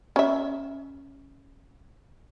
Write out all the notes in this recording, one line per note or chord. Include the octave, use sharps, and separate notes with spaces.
C#4 E5